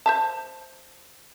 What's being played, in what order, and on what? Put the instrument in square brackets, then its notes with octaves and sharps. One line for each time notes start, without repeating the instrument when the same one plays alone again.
[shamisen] C5 E5 A5